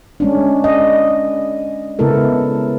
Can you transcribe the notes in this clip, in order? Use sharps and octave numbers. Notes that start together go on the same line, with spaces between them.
G#3 C#4 D4
D5 D#5
C#3 G#3 B3 E4 A4 A#4